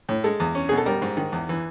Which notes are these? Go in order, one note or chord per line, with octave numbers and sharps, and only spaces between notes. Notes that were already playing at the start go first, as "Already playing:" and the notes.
A2
G#3 A4
E2
C#4
B2 G#4
A4
G3 A#4
G#2
D#3
E2
E3